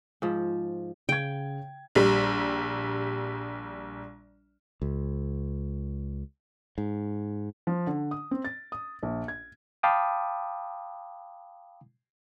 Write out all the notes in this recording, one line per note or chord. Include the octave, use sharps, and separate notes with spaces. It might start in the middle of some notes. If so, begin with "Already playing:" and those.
G#2 F3
C#3 G5 G#6
A#1 G3
C#2
G#2
F3
D3
D#6
C4
A6
D#6
A#1
G#6
F5 G5 A5 B5 D6 D#6